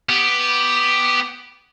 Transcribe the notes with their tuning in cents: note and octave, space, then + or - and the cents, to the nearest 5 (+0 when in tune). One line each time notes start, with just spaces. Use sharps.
B3 +0 G4 +0